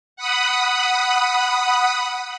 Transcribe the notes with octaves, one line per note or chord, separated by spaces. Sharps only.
F#5 B5 D#6